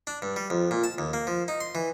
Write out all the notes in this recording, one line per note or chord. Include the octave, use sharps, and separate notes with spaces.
D4
G2
G3
F2
A#2
A5
D#2
A#3
F3
D#4
C6
E3